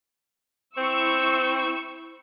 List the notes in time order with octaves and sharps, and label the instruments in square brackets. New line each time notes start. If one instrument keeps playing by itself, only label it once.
[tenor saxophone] C4 [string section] E4 C#6 E6